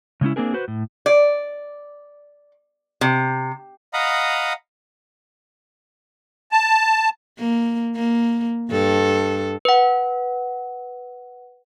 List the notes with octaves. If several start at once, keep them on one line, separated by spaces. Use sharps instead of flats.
C#3 G#3 C#4 E4
A#3 C4 D4 G#4 A#4
F#4 B4 C5
A2
D5
C3
D#5 F5 F#5 A#5 B5 D#6
A5
A#3
A#3
G2 A4
B4 F#5